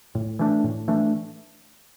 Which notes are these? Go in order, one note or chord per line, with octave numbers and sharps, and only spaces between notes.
A2
E3 A3 D4
A2
E3 A3 D4